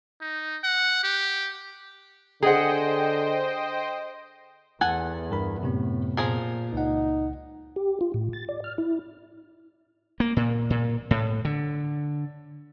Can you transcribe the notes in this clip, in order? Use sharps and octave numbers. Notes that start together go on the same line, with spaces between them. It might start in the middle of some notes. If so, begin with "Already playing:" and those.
D#4
F#5
G4
D3 G#4 C5 D#5 F#5 G5
E2 A4 F#5 G#5
G2 A#4 B5
F#2 A2 C3 B3
A#2 F3 G#4 A#4
C#2 D#4 F#5
G4
F4
A2
A6
D5
F6
E4
A#3
A#2
A#2
A2
D3